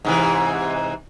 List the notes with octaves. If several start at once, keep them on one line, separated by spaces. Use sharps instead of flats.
G#2 C3 E3